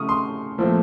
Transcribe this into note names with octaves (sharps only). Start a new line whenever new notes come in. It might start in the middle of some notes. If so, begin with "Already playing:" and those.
Already playing: C#3 A3 C#6 D#6 F6
C6
A#2 F3 A3 C4